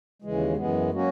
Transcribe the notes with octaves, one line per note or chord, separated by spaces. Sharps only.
D#2 C#3 E3 G#3
F#2 E3 G#3 B3
F#3 A#3 C#4 F#4